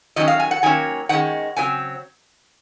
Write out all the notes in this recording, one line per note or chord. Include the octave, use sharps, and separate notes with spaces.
D#3 F#3 C#4 D#5
F5
G#5
F#5
D#3 F#3 A#3 C#4 G#5
D#3 G#3 C#4 F#5
C#3 F#3 C4 G#5